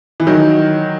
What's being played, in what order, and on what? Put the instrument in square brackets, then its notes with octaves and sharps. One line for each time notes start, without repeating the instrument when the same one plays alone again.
[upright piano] E3
D#3 F#3